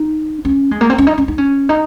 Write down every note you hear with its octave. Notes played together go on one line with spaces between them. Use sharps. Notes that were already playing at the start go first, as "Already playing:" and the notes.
Already playing: D#4
C#4
G#3
A#3
C4
C#4
D#4
C#4
D#4
C#4
D#4